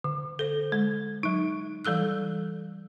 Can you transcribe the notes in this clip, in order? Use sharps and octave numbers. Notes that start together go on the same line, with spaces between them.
D3
A4 C5
G#3
F#3 D#4
E3 G3 A4 E6 F#6